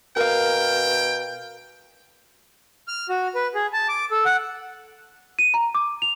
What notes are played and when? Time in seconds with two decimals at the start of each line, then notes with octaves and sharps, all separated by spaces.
0.17 B2 A#4 F5 G5
2.88 F6
3.09 F#4
3.35 B4
3.54 G#4
3.73 A5
3.88 D6
4.11 A4
4.25 F#5
5.39 D#7
5.54 A#5
5.75 D6
6.02 F7